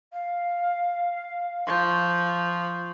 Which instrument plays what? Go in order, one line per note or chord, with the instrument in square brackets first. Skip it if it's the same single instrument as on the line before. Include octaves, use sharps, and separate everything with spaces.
[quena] F5
[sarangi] F3 [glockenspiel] C6 C#6 G6